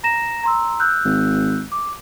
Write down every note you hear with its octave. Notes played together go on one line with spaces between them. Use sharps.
A#5 A#6 E7
A#5 C6 E6
E6 F#6 G6
G#1
D6